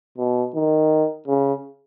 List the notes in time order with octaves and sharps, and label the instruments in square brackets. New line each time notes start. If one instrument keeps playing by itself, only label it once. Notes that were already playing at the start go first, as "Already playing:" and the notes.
[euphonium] B2
D#3
C#3